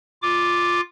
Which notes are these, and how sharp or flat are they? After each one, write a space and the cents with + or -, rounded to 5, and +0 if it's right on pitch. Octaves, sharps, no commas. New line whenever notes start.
F4 +5 D6 +0